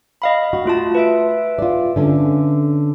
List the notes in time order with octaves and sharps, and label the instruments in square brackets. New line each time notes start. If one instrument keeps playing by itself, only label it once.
[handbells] D#5 F5 B5
[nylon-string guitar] F#4
[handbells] A3 F4 A5
B4 E5 D7
[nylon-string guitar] F4 D5
D3 C#4 D4